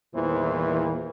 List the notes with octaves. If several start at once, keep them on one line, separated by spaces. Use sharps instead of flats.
E2 A#2 D#3 E3 G3 C5